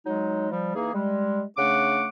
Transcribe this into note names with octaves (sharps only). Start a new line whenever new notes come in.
F#3 G#3 D#4
F3 G3
E3 A#3 D#4 G#4
G3 G#3
C#3 A3 D4 F#5 D6